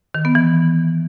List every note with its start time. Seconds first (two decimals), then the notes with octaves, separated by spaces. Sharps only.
0.14 D#3
0.25 B3
0.35 E3